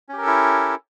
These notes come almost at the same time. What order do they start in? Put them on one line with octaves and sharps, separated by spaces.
C#4 G4 A#4 A4 E4